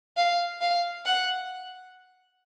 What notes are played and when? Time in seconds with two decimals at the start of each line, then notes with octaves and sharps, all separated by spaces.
0.17 F5
0.61 F5
1.06 F#5